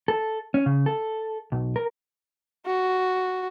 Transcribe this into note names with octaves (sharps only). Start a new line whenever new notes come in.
A4
C#4
C#3
A4
B1
A#4
F#4